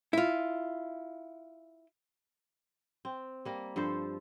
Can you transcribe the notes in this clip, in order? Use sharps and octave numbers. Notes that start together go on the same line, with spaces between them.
E4 F4
C4
G3 A#3 A#4
G2 F3 A4 C5